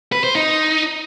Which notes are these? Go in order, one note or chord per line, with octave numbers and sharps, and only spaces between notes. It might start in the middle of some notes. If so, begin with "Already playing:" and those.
B4
C5
D#4